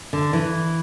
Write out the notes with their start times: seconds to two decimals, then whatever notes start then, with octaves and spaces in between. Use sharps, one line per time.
0.13 D3
0.33 E3